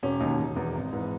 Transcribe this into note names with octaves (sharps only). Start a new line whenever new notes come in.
E1 C#4
D#2 D#4
D#3
E1
E2 D#3
G#1
G#2 E3